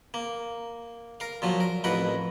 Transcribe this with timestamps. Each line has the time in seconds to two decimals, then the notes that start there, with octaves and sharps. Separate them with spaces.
0.14 A#3
1.20 A#4 F5
1.42 A#2 F3 F#3
1.60 A#4
1.84 A1 F2 A#4 B4 F#5